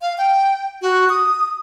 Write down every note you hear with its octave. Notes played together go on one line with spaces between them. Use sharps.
F5
G5
F#4
D#6